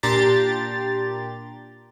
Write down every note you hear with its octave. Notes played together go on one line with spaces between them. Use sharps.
A#2 D4 G4 A#5 C6 A6